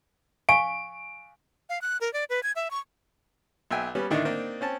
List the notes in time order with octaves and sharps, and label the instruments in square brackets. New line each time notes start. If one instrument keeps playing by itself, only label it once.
[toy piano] F5 G#5 C#6 [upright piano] D7
[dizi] F5
F#6
A#4
D5
B4
G#6
E5
C#6
[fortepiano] B1 E5 G5 G#5
G3 B3 C#4
A2 D3 D#3 A3 D4 D#4
A#3 C4 D4 D#4
C4 C#4 A5